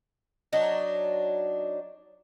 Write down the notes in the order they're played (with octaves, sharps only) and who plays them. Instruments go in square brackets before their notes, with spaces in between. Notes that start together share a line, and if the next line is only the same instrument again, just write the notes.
[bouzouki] F#3 D4 D#4